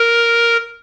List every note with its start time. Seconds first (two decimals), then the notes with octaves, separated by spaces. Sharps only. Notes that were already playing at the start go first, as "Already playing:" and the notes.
Already playing: A#4